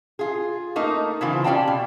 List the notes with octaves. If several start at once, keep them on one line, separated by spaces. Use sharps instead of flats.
F4 G#4
A3 A#3 D#4
C#3 E3 C4 F4
C#4 G4 D5 F5 G5 A5
B2